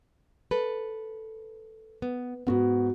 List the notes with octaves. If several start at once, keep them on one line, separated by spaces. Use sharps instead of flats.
A4 B4
B3
E2 G#2 B3 F#4